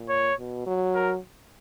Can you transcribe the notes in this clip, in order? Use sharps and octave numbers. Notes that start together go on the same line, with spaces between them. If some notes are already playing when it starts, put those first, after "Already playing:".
Already playing: A#2
C#5
B2
F#3
A#4